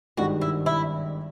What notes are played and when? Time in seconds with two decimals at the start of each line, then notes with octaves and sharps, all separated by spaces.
0.17 G#1 G2 D#3 G#3 F#4
0.41 E4
0.66 E4